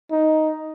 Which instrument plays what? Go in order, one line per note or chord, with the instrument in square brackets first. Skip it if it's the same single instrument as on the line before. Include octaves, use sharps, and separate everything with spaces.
[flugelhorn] D#4